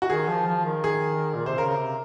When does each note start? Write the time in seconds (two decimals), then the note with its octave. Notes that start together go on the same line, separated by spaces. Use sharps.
0.02 F#4
0.10 D#3 G#4
0.28 F3
0.47 F3
0.65 D#3
0.84 G#4
1.35 A#2
1.46 C3 C5
1.58 C#3 A#4
1.76 C3